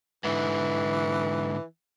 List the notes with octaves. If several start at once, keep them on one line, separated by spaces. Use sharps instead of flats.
G#2 D3 E3